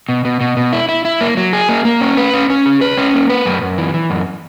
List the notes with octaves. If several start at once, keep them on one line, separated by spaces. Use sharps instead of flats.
B2
B2
B2
B2
E4
E4
E4
A#3
F#3
G#4
A#3
A#3
C#4
B4
C#4
C#4
G#4
B4
C#4
A#3
B4
F#2
F#2
E3
E3
F#2